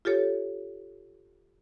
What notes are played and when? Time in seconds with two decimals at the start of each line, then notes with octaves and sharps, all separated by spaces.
0.05 F4 G4 A4 C#5